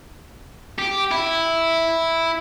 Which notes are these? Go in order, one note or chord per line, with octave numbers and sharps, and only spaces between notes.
G4
E4